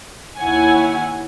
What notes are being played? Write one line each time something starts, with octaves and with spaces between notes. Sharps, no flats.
D#2 E4 C#5 F#5 G#5